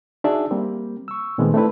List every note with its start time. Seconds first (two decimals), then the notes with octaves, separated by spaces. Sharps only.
0.24 D4 D#4 F#4 G#4 D5 E5
0.51 G3 A#3 C4
1.08 C#6 E6
1.38 A#2 D#3 G#3 A3 B3 C4
1.54 A3 C4 D4 E4 B4